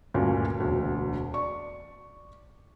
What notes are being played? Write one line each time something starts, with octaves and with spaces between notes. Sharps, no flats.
D2 G2 A#2 A#3 C#4
E1 D2
D5 C#6